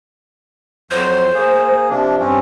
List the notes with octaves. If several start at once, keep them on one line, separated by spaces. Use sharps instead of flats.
F2 F#3 C5 C6
A#3 G#4
C3 F3 D4
G2 C4 C#4